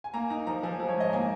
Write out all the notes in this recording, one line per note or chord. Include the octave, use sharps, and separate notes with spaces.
G#5
A#3 A#5
D#4 A#5
F3 A#5
F3 G#5
F3
C#5
G#2 D#5
A#3 G#5